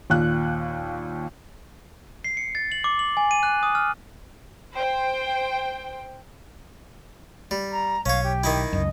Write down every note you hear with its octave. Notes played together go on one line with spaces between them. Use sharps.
D#2 A#2 F#6
C7
C#7
A6
F#7
D6
F#7
G#5
D#7
F#6
D#6
F6
C5 G5
G3
A#5
B1 C#4 C#5 F5
G4
D#3 D#4 E4
C#2 F#2 D#5